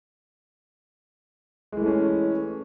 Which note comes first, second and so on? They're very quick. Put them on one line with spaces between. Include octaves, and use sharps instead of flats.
G#3 E3 A3 C#4